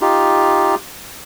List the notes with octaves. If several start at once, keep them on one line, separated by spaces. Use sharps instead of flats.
D#4 F4 G4